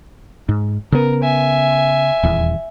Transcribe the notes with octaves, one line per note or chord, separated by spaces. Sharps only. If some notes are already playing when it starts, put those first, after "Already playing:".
G#2
C#3 B3 A#4
E5 G#5
D#1 E2